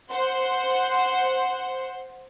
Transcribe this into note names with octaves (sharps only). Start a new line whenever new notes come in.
C5 F#5 C6